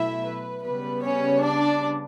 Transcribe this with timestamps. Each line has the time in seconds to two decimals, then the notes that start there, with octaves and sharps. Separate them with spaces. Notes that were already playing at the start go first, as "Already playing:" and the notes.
Already playing: B2 F#3 A3 E4 E5
0.22 B4
0.63 C#3 G3 B3 B4
1.03 C#4 C#5
1.44 D4 D5